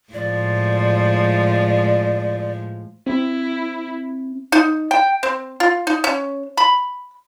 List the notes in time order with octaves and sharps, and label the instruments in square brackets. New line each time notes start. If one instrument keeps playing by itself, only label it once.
[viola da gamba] A2 F3 G#3 [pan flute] D5
[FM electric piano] C4 [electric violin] E4
[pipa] D#4
G5
C4
F4
D#4
C#4
B5